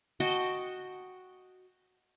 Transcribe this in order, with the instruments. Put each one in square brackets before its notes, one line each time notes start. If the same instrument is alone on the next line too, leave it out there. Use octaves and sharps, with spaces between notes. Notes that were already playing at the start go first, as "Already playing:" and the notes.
[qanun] F#4 D#5 G5 A5